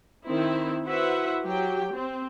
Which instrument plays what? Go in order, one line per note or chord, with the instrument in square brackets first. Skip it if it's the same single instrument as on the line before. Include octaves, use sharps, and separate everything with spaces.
[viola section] D#3 C4 E4
E4 F#4 B4 C5 E5 F#5
F#3 G4 G5
C4